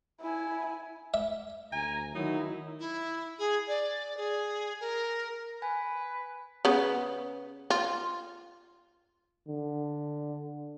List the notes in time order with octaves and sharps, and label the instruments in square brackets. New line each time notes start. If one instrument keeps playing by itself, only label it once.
[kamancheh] E4 G#5
[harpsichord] E5
[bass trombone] D2 [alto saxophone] G#5 [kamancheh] A#5
[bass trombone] D#3 [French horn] F#3 [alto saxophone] D#4 [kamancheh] E4
[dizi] E4
G#4
D5
G#4
A#4
[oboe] B4 [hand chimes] G#5
[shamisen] C#3 B3
F4
[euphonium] D3